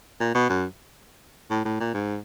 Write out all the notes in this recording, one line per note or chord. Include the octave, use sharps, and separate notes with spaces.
A#2
B2
F#2
A2
A2
A#2
G#2